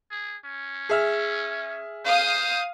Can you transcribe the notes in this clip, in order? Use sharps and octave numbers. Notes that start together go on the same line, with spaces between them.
G#4
C#4
G#4 E5 F6
C5 F5 D#6